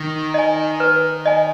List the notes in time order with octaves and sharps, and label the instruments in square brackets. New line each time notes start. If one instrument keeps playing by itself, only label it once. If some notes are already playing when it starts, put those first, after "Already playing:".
Already playing: [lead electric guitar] D#3
[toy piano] D#5 G#5
B4
D#5 G#5